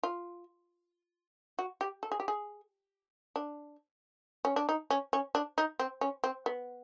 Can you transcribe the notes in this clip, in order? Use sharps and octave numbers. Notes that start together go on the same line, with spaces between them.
F4
F#4
G4
A4
G#4
G4
G#4
D4
C#4
D4
D#4
C#4
C#4
D4
D#4
C4
C#4
C4
B3